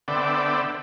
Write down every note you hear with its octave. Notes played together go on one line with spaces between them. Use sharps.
D3 B3 C4 D5 E5 G5